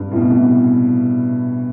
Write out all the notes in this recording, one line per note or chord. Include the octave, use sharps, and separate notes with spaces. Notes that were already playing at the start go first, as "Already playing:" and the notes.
Already playing: G2
A2
B2
C3